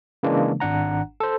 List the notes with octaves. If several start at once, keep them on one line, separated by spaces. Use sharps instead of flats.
C#3 E3 G#3 A#3 D4
G#1 D4 F#5 A#5
A4 C5